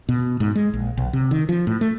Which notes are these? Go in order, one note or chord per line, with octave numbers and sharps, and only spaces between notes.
B2
G#2
G#3
A#1
B1
C3
D#3
F3
A2
A3